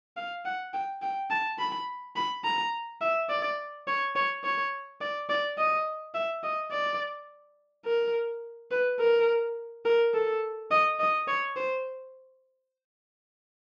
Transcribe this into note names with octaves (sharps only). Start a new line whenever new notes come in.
F5
F#5
G5
G5
A5
B5
B5
A#5
E5
D5
C#5
C#5
C#5
D5
D5
D#5
E5
D#5
D5
A#4
B4
A#4
A#4
A4
D#5
D#5
C#5
C5